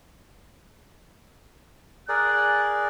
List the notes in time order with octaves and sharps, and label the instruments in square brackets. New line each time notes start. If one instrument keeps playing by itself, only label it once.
[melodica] G#4 A#4 D5 [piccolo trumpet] F#6